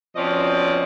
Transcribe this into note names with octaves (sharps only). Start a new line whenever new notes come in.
B2 F3 C4 C#4 D5 D#5